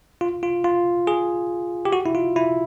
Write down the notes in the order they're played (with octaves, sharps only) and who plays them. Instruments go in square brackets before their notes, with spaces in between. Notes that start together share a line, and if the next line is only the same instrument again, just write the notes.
[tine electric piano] F4
F4
F4
G#4
G4
F#4
E4
F4
E4